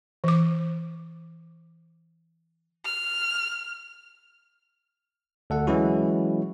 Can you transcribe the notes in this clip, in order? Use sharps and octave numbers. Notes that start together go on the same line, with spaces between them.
E3 D6
F6
D2 A4 F#5
E3 F#3 G#3 C#4 E4 F#4